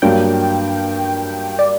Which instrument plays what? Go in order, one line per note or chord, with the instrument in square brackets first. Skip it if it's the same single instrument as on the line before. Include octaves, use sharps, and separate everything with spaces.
[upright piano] G2 F#3 A#3 D4 [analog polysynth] G5
[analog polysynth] D5